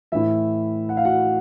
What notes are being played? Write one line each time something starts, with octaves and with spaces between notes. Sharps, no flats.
A2 E3 E4 E5
F#5
F5
F#4 F#5